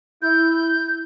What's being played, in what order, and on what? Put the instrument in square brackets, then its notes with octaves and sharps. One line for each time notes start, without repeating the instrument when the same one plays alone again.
[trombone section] E4 [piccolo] G6